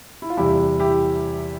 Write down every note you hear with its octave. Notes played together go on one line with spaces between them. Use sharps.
E4
F4
E2 C3 G3 E4 G4
E4 G4